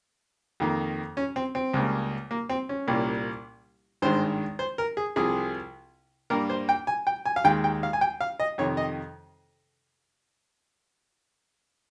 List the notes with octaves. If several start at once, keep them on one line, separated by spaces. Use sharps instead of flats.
F2 D#3 A#3
C#4
C4
C4
C#2 C#3 G3 A#3
A#3
C4
C#4
C2 A#2 G3 A#3
G#1 G2 D#3 G#3 C5
C5
A#4
G#4
C2 C3 F3 G#4
G2 G3 A#3 A#4
C5
G5
G#5
G5
G#5
F5
D#2 D#3 G#3 G5
G5
F5
G#5
G5
F5
D#5
F2 C3 D#3 C#5
D#5